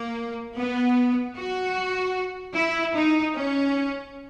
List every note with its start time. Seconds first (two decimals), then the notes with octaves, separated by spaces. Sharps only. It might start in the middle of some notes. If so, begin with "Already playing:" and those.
Already playing: A#3
0.57 B3
1.36 F#4
2.55 E4
2.95 D#4
3.35 C#4